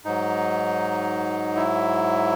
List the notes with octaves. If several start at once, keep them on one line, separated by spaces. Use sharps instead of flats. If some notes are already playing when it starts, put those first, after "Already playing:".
G#2 F#3 D#4
E4